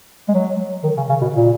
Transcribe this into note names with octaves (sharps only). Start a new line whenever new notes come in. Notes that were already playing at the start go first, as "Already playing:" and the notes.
G#3
F#3
D#3
C#3
C#3
B2
A#2